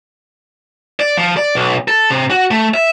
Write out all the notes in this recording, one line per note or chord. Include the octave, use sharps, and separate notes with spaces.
D5
F3
D5
B1
A4
C3
F#4
A3
E5